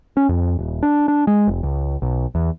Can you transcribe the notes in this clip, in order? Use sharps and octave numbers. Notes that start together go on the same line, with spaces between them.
C#4
F2
D#1
D4
D4
G#3
F1
C#2
B1
E2